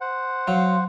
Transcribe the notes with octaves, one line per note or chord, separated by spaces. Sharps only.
C5 F#5
F#3 F5 C6